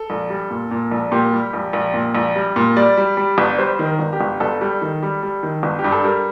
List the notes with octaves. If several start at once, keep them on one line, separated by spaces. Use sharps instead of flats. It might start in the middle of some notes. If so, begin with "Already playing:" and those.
Already playing: A4
A#1
G3
A#2
A#2
A#1
A#2 G4
G3
A#1
A#1
A#2
A#1
G3
A#2
G3 D5
G3
G3
G1
G3 C5
D#3
A#4
G1
G4
G1
G1 A4
G3
D#3
G3
G3
D#3
G1
G4
G2
A4
G3 A#4